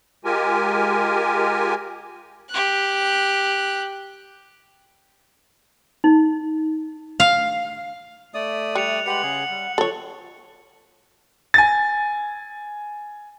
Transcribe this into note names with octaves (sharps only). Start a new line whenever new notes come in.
G#3 F4 G4 A#4 G#5
G4 F#6
D#4
F5
A3 D5 E5 D#6
G3 F#6 C#7 F7
G#3 G4 B4 F#5 C#7 F#7
C#3 G#4
G3
D3 F#3 F4 A4 C#5
G#5 A6